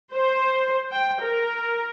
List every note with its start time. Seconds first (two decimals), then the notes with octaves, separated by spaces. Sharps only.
0.15 C5
0.92 G5
1.22 A#4